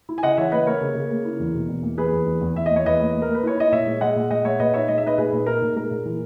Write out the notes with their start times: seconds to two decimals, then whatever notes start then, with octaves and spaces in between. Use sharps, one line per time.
0.09 E4
0.18 G#5
0.23 C#3 D#5 F#5
0.37 E3 C#5 E5
0.51 A#3 B4 D#5
0.66 A#3 A#4 C#5
0.81 C#3
0.95 C#3
1.10 A#3
1.25 E4
1.39 E2
1.54 B2
1.68 E2
1.83 A#3
1.98 E2 G#4 B4
2.12 E2
2.26 E2
2.41 E2
2.56 E2 E5
2.66 A#3 D#5
2.76 C#5
2.85 E2 B4 D#5
3.00 A#3
3.14 A#3
3.22 A#4
3.29 A#3
3.35 B4
3.43 E4 C#5
3.58 E4 D#5
3.72 A#2 C#5 E5
3.86 G#3
4.01 G#3 D#5 F#5
4.16 A#2
4.31 G#3 D#5 F#5
4.45 G#3 C#5 E5
4.60 A#2 B4 D#5
4.74 D#4 C#5 E5
4.88 G#3 D#5
4.98 E5
5.03 D#4 B4 D#5
5.18 A#2 G#4 B4
5.32 A#2
5.46 D#4 A#4
5.62 A#2
5.76 G#3 A#4
5.91 A#2
6.05 E3